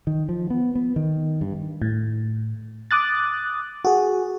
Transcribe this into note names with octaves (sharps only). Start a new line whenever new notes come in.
D#3
F3
B3
B3
D#3
G2
A2
D6 D#6 F#6 A6
F#4 G#4